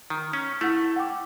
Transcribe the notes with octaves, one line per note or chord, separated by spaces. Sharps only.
D#3
C#4
A3 E4 F#5
F#5 G5 D6